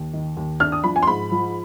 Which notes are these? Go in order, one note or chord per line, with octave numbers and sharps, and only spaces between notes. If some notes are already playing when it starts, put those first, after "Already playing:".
Already playing: D#2
D#3
D#2
D4 F6
D#6
F3 B5
G#5
C6
G#2 B5
F3